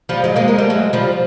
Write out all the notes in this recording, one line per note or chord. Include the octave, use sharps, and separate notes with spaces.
F3 G3
F#3 G#3
G#3 A#3
G#3 A#3
G3 A3
F#3 G#3
F3 G3